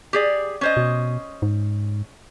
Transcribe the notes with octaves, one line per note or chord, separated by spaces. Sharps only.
G4 G#4 D5
C#4 C5 D#5
B2
G#2